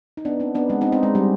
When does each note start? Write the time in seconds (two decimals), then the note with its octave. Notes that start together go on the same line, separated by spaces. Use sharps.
0.17 D#4
0.25 B3 D4
0.40 C4 D#4
0.55 B3 D4
0.70 G#3 C4
0.81 C4 D#4
0.92 C4 D#4
1.03 G#3
1.15 G3